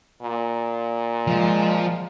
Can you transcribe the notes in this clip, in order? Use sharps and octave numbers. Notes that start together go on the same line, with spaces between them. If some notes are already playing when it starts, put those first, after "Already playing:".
A#2
F3 G#3